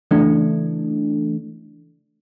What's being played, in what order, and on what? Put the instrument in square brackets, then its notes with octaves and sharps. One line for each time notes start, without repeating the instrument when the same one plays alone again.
[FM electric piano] C#3 E3 A3 D4